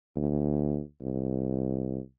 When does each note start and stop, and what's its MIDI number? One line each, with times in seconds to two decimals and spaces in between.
0.16 0.80 38
1.01 1.99 36